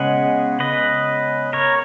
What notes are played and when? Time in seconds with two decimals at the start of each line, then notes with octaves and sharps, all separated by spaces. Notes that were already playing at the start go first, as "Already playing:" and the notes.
Already playing: C#3 G#3 B3 D#5 F#5
0.60 B4 D#5
1.53 A#4 C#5